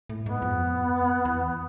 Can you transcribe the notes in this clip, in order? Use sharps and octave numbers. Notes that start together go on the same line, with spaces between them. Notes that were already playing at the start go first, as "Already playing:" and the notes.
A2
G#2 B3
F2
E2